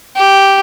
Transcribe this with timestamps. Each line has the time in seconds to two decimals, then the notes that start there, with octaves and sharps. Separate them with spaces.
0.16 G4